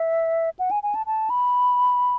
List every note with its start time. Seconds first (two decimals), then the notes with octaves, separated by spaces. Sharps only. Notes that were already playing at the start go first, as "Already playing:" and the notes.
Already playing: E5
0.59 F#5
0.71 G#5
0.83 G#5
0.95 A5
1.06 A5
1.30 B5